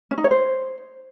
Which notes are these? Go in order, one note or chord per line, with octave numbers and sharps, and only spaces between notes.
C#4
D#4
C#5
C5